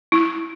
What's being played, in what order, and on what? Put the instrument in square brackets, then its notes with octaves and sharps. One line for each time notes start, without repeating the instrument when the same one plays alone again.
[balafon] E4